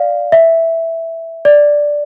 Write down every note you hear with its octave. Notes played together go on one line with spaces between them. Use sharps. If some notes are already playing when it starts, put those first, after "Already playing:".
Already playing: D5 F5
E5
D5